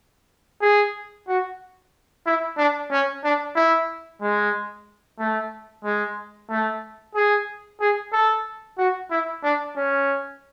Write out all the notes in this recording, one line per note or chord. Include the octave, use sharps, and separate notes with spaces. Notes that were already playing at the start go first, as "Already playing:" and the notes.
G#4
F#4
E4
D4
C#4
D4
E4
G#3
A3
G#3
A3
G#4
G#4
A4
F#4
E4
D4
C#4